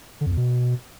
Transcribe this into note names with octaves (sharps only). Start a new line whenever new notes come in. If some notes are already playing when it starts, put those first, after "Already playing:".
D3
F2
E2
B2